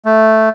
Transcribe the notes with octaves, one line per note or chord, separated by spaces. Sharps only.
A3